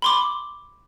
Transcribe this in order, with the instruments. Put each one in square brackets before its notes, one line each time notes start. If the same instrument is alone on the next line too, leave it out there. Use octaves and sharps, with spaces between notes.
[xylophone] B5 C6 D6